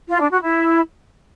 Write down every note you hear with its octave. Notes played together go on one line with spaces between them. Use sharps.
F4
D4
F#4
E4